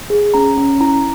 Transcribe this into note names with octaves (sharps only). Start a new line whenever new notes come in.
G#4
C#4 A#5
C#4
E4 A#5